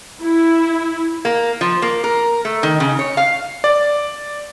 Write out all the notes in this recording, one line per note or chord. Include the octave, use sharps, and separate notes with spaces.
E4
A#3
F3
A#3
A#4
A3
D#3
C#3
C#5
F5
D5